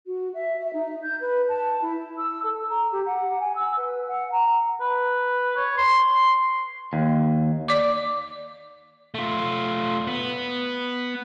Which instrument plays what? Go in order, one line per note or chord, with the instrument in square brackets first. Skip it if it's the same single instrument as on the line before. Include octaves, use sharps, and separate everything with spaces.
[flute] F#4
E5
E5
D#4
G6
B4
A5
E4
E6
A4
A#5
G4
F#5
G#5
E6
B4
F#5
A#5
[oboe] B4
C#5
C6
[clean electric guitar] D#2
[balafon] D5 D6
[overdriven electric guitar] A3 F4
B3